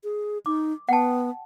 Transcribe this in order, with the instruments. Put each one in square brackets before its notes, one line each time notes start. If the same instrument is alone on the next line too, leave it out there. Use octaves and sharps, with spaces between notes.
[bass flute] G#4
[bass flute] D#4 [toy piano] D6
[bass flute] B3 [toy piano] F#5 G5 A5